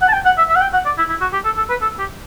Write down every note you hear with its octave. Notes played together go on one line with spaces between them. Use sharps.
F#5
A5
G5
F#5
E5
E5
F#5
G5
F#5
D5
E4
E4
F#4
G4
A4
A4
B4
A4
G4